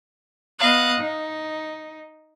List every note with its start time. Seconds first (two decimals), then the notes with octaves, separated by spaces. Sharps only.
0.60 B3 D#5 F5 F#6
1.00 D#4